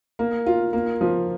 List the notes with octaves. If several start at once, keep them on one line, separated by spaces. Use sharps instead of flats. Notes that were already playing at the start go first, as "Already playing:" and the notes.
A#3
F4
A#3
F3